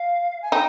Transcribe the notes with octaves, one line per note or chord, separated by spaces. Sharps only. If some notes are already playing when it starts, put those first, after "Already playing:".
Already playing: F5
G#5
D#4 G5